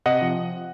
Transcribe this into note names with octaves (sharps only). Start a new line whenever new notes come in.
C3 D#5 F#5
F3